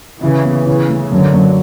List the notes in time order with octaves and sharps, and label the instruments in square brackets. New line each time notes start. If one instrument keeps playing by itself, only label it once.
[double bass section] C#3 E3 [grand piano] E4
[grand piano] B3
[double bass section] C#3 E3 [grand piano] C#4
[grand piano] A3
[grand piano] F#2 [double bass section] D3 F#3
[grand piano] F#2